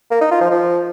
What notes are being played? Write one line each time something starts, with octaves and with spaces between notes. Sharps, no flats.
A#3
D#4
F4
F3
F3